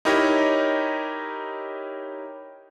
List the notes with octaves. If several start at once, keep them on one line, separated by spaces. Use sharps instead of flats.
D#4 E4 G4 A#4 C#5 D#5